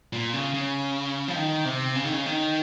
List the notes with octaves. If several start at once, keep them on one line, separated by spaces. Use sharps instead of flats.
A#2
C#3
C#3
F3
D#3
C3
C#3
D#3
C#3
D#3